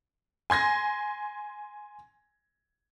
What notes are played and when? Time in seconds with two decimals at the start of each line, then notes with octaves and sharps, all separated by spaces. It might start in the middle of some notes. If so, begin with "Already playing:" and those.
0.50 G#5 C6 G#6 A#6